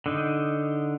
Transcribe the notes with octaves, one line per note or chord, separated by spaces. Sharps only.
D3 D#4